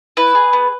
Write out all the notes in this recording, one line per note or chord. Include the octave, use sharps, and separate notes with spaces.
E4 B4
G#4
B3